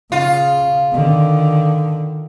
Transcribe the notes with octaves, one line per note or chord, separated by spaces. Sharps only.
C#3 F4
D3 D#3